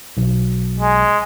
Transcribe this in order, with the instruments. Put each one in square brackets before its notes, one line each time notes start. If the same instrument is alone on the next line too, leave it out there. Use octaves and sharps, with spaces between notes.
[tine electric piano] B1
[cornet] G#3